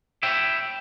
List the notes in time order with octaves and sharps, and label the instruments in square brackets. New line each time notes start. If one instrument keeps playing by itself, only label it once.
[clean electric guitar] E4 E5 G5